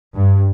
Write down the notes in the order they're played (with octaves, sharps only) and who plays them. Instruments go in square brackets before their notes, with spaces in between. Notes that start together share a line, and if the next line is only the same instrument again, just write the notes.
[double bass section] G2